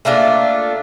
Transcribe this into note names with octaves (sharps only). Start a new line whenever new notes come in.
A3 A#3 D4 F4